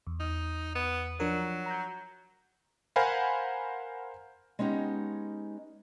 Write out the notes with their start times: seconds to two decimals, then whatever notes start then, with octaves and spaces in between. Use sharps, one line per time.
0.07 E2
0.20 D#4
0.75 B3
1.20 F3 F#3 D4 A#4
1.66 A#5 G6
2.96 A#4 C5 F5 F#5 G#5 B5
4.59 G#3 B3 C#4 D#4 G4